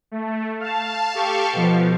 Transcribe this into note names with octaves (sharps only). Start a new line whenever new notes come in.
A3
F5 A5
G4 A4 F5 C#6
B2 F3